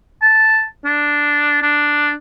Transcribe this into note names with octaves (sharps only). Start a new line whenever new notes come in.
A5
D4
D4